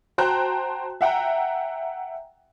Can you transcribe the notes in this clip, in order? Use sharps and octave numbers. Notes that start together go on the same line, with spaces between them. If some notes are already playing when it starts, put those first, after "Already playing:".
F#4 C5 G5 A5 A#5 F#6
E5 F#5 G5 A#5